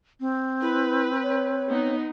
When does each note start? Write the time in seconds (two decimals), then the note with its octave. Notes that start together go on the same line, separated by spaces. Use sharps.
0.20 C4
0.62 E4 B4
1.23 C#5
1.69 B3 D#4